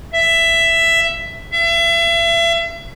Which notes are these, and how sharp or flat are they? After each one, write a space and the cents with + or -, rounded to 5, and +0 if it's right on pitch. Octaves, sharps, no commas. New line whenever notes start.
E5 +10
E5 +35